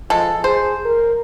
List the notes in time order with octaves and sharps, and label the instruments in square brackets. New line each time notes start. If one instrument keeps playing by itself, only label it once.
[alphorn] F3 [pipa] G#3 A4
[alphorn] G#4 [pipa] C5
[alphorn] A#4